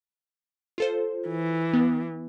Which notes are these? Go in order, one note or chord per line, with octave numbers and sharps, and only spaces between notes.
F4 A4 C5
E3
B3